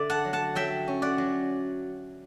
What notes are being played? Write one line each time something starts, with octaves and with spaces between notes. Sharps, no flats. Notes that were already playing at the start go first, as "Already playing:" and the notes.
Already playing: D3 D5 E5
F#5 A5
F#3
F#5 A5
F#3 E5 G5
C#4
D5 F#5
F#3